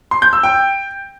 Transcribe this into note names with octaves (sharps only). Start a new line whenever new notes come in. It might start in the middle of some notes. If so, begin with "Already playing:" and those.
C6
G6
E6
G5